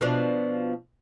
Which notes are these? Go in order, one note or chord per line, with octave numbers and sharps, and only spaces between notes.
B2 F3 D4